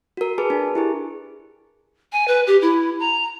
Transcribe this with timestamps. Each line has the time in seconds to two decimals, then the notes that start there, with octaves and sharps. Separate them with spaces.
0.17 F#4 A#4
0.38 G#4 A#4 B4 A5
0.50 D4
0.75 E4 G4 G#4
2.12 G#5
2.28 B4
2.47 G4
2.62 E4
3.00 A#5